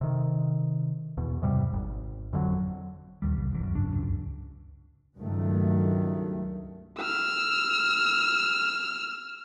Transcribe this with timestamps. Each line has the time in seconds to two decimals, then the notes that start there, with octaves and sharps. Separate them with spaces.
0.01 C3 D#3
1.17 E2 B2
1.42 E2 G#2 C3 G3
1.73 G#1
2.33 F2 D3 D#3 F#3
3.22 D#1 A#1 D#2 G3
3.35 F1 C2
3.51 E1 E2
3.63 F#2
3.75 G#1 C#2 D4
3.92 C#2 F#2
5.18 C#2 G2 D#3 F#3 A3
7.00 E6 F6